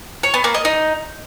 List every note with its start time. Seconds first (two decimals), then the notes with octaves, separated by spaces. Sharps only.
0.23 C#5
0.34 B3
0.44 A#3
0.54 D#5
0.65 D#4